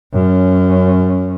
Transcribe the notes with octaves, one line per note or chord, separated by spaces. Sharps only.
F#2 C#4